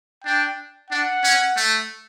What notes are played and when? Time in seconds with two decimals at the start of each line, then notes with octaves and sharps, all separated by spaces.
0.24 D4 G5
0.90 D4 F#5
1.23 C#4
1.56 A3